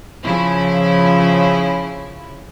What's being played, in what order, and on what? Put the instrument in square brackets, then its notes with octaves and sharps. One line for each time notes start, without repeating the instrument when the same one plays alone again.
[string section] C#3 F3 E4